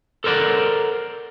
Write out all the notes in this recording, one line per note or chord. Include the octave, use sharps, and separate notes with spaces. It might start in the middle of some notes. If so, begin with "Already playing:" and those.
A4 A#4 C5 D5 F#5